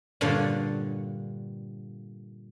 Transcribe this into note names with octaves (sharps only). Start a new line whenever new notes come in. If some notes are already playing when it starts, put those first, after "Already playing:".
G2 A#2 D3 C#5 F#5